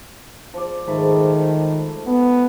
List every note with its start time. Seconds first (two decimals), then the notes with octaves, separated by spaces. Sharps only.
0.54 F3 D5
0.87 G#2 D#3 A3 B5
2.07 B3